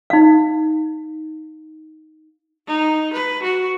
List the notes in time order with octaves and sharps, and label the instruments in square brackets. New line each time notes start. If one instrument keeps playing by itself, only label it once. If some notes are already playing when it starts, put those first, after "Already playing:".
[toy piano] D#4 F5
[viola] D#4
B4
F#4